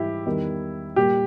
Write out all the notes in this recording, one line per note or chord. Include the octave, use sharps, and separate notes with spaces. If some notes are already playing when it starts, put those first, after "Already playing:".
Already playing: G#2 E3 G3 E4 G4
E2 D#3 G3
A#2 G3 G4